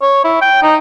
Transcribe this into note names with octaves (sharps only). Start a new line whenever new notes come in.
C#5
E4
G5
D#4